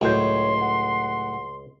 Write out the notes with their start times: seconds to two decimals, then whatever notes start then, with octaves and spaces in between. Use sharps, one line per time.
0.01 C#2 F#2 A2 C5 C#5 C6
0.60 F#5